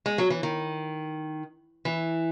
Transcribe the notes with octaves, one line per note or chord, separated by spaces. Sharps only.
G#3
F#3
E3
D#3
E3